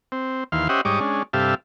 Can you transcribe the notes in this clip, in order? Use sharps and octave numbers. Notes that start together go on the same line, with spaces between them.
C4
D#2 E3 F5 C6
C#4 G4 C5 D#5 E5 F#5
G#2 G3 C#5 D#5 D6
G#3 C#4 D4
G2 C3 G4 A4 E5 F5